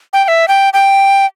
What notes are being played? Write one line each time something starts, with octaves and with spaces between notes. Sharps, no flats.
G5
G5
E5
G5
G5